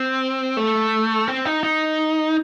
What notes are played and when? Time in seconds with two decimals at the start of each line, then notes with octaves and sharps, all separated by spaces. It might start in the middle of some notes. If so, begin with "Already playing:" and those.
Already playing: C4
0.57 A3
1.28 C4
1.45 D#4
1.63 D#4